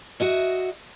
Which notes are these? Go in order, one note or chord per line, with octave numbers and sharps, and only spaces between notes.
F#4 D#5 E5